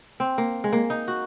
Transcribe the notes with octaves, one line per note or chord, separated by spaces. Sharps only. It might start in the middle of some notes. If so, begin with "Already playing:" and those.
C4
A#3
G#3
A#3
D#4
F#4